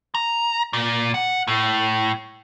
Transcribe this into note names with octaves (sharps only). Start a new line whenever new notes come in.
A#5
A#2
F#5
A2